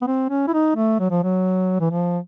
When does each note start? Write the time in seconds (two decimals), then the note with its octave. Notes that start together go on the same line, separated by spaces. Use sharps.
0.01 B3
0.07 C4
0.29 C#4
0.47 E4
0.53 D#4
0.76 A3
0.99 F#3
1.10 F3
1.23 F#3
1.80 E3
1.91 F3